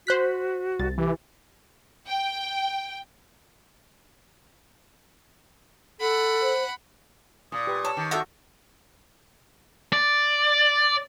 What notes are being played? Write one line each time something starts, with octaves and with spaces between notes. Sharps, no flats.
F#4 C5 F#6 B6
C2 A6
E3 G4
G5
A4 F#5 B5
C5
A#2 D#6
G4 B4
A4 C#5
D#3 D6
F#4 A4 D5 E5 F#5 A#5
D5